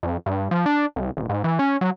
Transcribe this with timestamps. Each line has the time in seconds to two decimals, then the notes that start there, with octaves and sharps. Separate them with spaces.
0.03 F2
0.26 G2
0.51 F3
0.66 D4
0.96 C2
1.17 D#1
1.29 G#2
1.44 E3
1.59 C#4
1.81 F#3